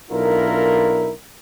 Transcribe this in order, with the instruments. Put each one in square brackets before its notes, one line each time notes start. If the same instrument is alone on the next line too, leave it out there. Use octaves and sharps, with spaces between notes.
[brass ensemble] B1 D4 E4 F4 A#4